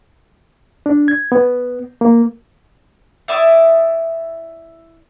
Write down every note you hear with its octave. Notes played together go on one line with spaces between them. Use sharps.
D4
G#6
B3
A#3
E4 D5 E5 D#6